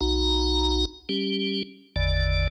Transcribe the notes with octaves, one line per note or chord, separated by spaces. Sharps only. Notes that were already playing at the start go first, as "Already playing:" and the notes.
B1 D#4 F#4 A#5
G3 C#4 G4
G#1 E2 D3 D5